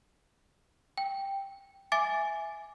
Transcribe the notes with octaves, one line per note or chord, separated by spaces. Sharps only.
G5
E5 G#5 D6 A6